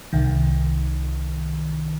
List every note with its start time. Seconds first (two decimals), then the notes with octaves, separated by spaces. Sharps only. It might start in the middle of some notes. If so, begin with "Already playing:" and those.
0.13 C2 D#3